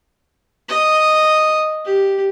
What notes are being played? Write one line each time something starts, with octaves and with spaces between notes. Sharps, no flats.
D#5
G4